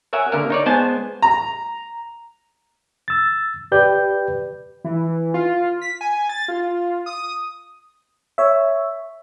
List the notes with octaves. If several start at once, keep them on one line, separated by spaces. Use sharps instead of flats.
A#4 C#5 E5 F#5 G#5
D3 A#3 A#4
D#4 C#5 D5
G#3 B3 C5 G#5 A5
A#5
E6 A6
G4 B4 D5 G5 G6
E3
F4
B6
G#5
A6
F4
D#6
C#5 E5